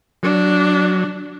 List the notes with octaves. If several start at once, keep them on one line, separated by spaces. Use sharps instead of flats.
F#3 D4